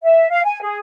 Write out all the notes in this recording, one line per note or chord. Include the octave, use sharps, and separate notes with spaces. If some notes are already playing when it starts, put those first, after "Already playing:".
E5
F5
G#5
G#4